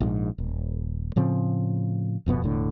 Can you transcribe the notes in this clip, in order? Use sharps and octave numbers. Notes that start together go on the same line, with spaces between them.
A#1 G#2
D#1
A2 C#3 F3 C4
D1 F2 B2 B3
E1 A2 D3